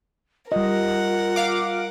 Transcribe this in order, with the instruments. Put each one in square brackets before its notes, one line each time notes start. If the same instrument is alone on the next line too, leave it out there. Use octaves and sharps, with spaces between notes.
[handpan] G3 D#5 [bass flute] F4 [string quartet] A#4 F#5
[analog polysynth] F5 D6